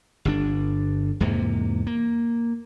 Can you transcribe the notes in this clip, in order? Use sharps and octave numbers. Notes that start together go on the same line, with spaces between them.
G1 C3 D4
E2 G#2 C3 A#3
A#3